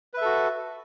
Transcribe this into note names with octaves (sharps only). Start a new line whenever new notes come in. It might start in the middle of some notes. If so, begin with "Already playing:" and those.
F#4 A4 B4 E5